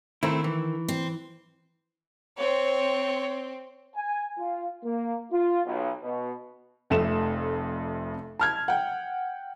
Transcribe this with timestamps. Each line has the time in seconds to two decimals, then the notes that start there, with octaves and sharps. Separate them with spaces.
0.23 D#3 A3 C4 E4
0.44 E3
0.88 C4
2.39 C4 C#5
3.95 G#5
4.38 F4
4.84 A#3
5.32 F4
5.65 B1
6.02 B2
6.90 F1 F2 A3 E7
8.39 A5 F6 G#6
8.68 F#5 G5